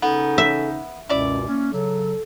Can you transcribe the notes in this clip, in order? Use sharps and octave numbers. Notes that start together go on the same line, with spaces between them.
C#3 B3 C#4 D#4 A4
E5
C#2 F#2 B2 C#4 E4 D5
A#3 C#4
C#3 F#3 A4